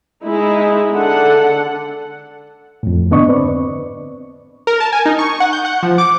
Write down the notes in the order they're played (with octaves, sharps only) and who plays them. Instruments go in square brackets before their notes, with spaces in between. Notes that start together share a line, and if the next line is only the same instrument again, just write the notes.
[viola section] G#3 D#4 E4
D3 A4 F#5
[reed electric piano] F2 A2
G#2 D3 B3 D4 D#5 C#6
C4 B4 D5
[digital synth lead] A#4
A5
G#5
D#4
C#6
F#5
G6
F#5
F3
D6